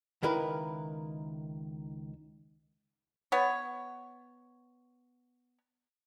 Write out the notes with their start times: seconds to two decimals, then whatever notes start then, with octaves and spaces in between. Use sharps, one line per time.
0.23 C#2 D#3 E4 A#4 B4
3.32 B3 C#5